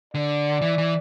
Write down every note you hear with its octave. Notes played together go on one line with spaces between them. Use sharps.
D3 D5
E3
E3